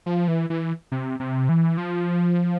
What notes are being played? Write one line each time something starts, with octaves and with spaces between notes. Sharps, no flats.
F3
E3
E3
C3
C3
E3
F3